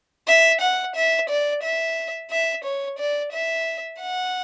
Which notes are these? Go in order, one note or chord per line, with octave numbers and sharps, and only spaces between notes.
E5
F#5
E5
D5
E5
E5
C#5
D5
E5
F#5